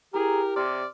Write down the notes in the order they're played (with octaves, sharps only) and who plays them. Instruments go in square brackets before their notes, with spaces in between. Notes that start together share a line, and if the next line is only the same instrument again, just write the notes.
[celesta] E4 A#5 [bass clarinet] G4 [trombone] G#4 [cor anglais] A#4
[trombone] C3 [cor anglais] D5 [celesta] C6 F6